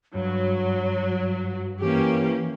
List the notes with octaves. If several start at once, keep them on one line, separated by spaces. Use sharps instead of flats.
G2 F#3 C#5
E3 A#3 C#4 G4